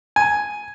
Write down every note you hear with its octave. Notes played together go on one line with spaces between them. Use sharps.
G#5